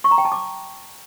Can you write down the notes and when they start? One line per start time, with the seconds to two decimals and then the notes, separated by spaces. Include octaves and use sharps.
0.04 C#6
0.11 A#5
0.18 G5
0.25 A5
0.32 D6